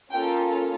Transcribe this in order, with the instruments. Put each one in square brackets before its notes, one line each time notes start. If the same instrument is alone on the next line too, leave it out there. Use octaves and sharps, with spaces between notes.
[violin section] A#3 C#4 F4 A4 G5